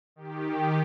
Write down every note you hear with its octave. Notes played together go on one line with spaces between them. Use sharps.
D#3 G4